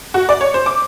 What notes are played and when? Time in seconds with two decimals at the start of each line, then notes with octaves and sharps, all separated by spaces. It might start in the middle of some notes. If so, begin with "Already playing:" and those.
0.14 F#4
0.29 D5
0.41 C#5
0.54 C5
0.66 D6